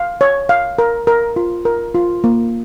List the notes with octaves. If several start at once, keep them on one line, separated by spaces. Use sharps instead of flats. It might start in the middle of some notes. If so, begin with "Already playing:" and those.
Already playing: F5
C#5
F5
A#4
A#4
F4
A#4
F4
A#3